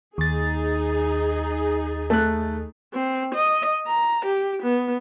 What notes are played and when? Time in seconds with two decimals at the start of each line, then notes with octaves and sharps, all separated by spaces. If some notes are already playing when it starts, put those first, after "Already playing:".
0.18 D#2 D#4 G#4 A6
2.10 A3 F#6
2.94 C4
3.35 D#5
3.87 A#5
4.25 G4
4.63 B3